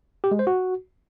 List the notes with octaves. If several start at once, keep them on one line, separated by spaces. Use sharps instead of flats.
G4
G#3
C5
F#4